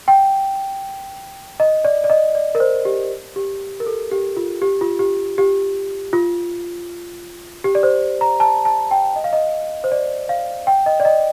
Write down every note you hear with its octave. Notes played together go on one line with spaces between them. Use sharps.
G5
D#5
D5
D5
D#5
D5
A#4
C5
G4
G4
A#4
A4
G4
F4
G4
F4
G4
G4
F4
G4
D5
C5
A#5
A5
A5
G5
D#5
F5
D#5
C5
D5
F5
G5
D#5
D5
D#5